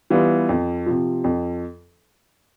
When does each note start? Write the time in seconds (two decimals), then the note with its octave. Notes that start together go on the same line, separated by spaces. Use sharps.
0.10 E3 G3 B3 F4
0.49 F2
0.86 C3 F3
1.24 F2